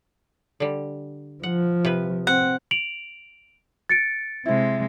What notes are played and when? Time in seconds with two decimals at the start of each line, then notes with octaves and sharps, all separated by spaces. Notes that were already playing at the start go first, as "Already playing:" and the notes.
0.60 D3 G3
1.43 F3 F#5
1.85 C3 B4
2.27 C4 F#5
2.71 D7 F7 F#7
3.89 A6 C#7 D7
4.46 C3 G#3 E4 C5